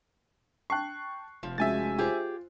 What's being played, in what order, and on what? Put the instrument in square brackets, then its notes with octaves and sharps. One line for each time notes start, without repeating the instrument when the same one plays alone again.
[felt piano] G5 A5 C7 [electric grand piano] C#6 F#6
[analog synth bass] F1 [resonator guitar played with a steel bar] F3
[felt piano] G#3 C#4 F#4 [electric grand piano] E5 G#5 A6
[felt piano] F4 C5 [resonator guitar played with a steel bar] G4 G#4